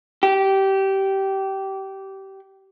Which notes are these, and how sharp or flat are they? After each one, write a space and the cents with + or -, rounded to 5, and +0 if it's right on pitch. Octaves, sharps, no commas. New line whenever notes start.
G4 -20